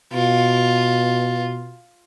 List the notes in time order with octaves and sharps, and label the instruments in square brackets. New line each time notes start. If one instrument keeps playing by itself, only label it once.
[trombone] B2 [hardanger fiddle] F4